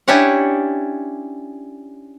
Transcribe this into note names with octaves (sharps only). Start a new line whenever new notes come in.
C#4 D4 E4 G4 C#5 F#5